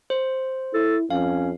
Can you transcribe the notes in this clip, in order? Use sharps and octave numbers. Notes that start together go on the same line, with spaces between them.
C5
E4 A4
F2 C#4 F5